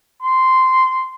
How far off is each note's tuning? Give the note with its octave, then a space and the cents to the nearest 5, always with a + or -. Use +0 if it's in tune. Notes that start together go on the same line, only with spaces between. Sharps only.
C6 -10